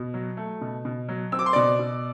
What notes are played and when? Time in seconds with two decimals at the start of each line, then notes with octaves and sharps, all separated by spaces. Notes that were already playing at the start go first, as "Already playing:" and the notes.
Already playing: B2
0.14 F#3
0.37 A3
0.61 B2
0.85 B2
1.09 F#3
1.32 C4 E6
1.39 D6
1.46 C6
1.53 B2 D5 D6
1.79 B2